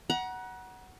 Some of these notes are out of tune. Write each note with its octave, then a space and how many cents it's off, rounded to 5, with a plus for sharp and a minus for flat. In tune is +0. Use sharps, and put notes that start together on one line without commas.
F#5 +10 A#5 +40